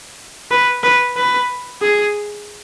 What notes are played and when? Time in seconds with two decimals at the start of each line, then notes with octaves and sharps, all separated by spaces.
0.51 B4
0.83 B4
1.17 B4
1.82 G#4